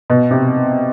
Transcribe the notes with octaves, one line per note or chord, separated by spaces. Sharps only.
B2
C3